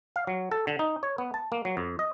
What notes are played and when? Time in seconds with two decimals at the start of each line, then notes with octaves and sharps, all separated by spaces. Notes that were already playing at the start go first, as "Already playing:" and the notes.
0.16 F5
0.27 F#3
0.51 A4
0.67 D3
0.79 D#4
1.03 C#5
1.18 B3
1.34 A5
1.52 A#3
1.65 F#3
1.77 F2
1.99 D#5